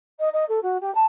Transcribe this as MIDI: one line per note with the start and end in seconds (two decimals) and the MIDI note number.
0.20 0.29 75
0.33 0.45 75
0.48 0.62 69
0.62 0.77 66
0.80 0.92 67
0.94 1.05 81